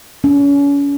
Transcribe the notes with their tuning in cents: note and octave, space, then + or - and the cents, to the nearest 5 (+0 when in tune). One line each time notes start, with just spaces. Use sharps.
C#4 +35